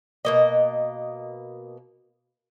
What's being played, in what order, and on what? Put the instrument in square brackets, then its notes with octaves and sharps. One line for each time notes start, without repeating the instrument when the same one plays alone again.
[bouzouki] B2 A#3 D#5